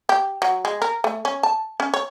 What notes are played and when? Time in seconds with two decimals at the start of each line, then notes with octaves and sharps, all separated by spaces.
0.09 G4
0.42 F#3
0.65 G#3
0.82 A#4
1.04 A3
1.25 C#4
1.43 A5
1.80 C#4
1.94 C#5